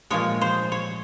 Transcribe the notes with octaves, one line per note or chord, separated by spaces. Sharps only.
A#2 F3 G#3 C#5
C5
C#5